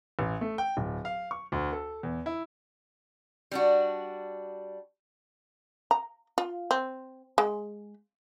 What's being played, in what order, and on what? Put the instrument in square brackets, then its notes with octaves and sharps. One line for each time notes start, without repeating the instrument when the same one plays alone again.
[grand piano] A1
A3
G5
D1
F5
C#6
D2
A4
E2
E4
[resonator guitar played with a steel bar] G3 D4 F#4
[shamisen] A#5
F4
C4
G#3